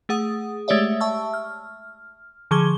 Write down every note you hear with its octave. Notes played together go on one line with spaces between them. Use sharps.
A3 G#4 F#5 D#6
G#3 A3 G4 C#5 D5 E5
E5 A5 C#6 E6
F6
D3 F3 G#4 C#6 G#6 G7